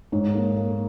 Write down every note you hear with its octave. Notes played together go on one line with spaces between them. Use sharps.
G#2 C#5
A#3
A#3